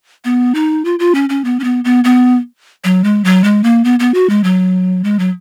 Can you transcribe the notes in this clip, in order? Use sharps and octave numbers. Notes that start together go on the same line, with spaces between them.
B3
D#4
F4
F4
C#4
C#4
B3
C#4
B3
B3
B3
F#3
G#3
F#3
G#3
A#3
B3
B3
F#4
G#3
F#3
G#3
F#3